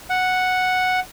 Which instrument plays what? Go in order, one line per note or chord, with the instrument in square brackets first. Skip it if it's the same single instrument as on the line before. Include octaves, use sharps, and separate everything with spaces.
[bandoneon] F#5